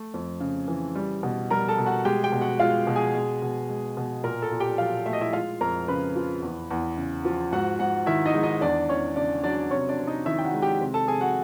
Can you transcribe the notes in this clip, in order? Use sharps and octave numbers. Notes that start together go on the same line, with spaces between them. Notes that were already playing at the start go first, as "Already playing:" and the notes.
Already playing: A3
F2
C#3
E3
G3
B2
G3 A#4 A#5
A4 A5
B2
F#4 F#5
G#3 G4 G5
G4 G5
B2
F#4 F#5
G#3 F4 F5
B2
G#4 G#5
G#3
B2
G#3
B2
A#2 A#4 A#5
A4 A5
A#2
G4 G5
F#3 F4 F5
A3 E5
D#5
E4 E5
G#3 F4 F5
F2 A#4 A#5
C#3 B4 B5
F3
E2
E2
C#3
F3
G#2 F#4 F#5
G#2 F#4 F#5
D#3 E4 E5
D#4 D#5
G#3
D#4 D#5
E2 D4 D5
E2 C#4 C#5
C#3 D4 D5
F#3 D4 D5
C3 C#4 C#5
D4 D5
C3
D#4 D#5
D#3 E4 E5
G5
F#4 F#5
G#3
G4 G5
C3
A4 A5
C3 G#4 G#5
F#4 F#5